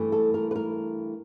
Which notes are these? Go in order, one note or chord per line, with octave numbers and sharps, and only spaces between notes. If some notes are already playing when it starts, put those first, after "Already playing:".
Already playing: G2 E3 A3
A4
A#4
B4
A#4